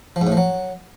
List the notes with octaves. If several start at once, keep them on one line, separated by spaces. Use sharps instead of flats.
F3
G#2
A2
F3
F#3